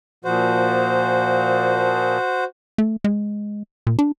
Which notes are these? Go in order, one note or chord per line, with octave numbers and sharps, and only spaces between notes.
A#2 F3 F#4 C5
A3
G#3
A#2
D4